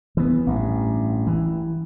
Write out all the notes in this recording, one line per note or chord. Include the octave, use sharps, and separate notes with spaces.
E3 B3
A1 G2
E3